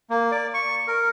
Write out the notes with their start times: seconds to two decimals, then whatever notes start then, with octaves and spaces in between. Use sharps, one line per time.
0.10 A#3
0.31 D5
0.54 C#6
0.87 A#4